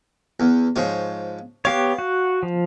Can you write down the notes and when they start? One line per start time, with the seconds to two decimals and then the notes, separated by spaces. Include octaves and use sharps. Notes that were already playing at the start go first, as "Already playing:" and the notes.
0.40 E2
0.76 G#2 F3 C#5
1.65 B3 G4 C#5 F5
1.99 F#4
2.43 F3